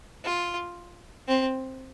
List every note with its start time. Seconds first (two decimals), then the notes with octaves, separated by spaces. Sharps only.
0.24 F4
1.28 C4